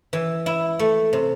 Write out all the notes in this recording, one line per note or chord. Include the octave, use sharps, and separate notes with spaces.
E3
E4
A3
C3